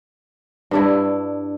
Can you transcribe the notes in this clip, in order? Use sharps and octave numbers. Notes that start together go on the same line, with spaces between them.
G2 D4 E4